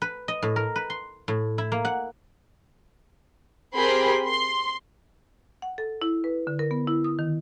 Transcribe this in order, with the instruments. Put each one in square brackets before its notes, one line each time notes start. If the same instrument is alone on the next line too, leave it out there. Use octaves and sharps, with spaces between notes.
[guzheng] B4
D#5
A2
A#4
B4
C6
A2
E4
A#3
F#5
[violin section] C4 G4 G#4 A#4 B5 C6
C6
[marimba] F#5
A4
E4
B4
D3
A#4
B3
E4
D#6
D#3